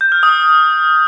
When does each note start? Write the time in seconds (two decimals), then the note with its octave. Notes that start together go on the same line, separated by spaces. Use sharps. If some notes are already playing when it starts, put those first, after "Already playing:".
0.01 G6
0.12 F6
0.23 D#6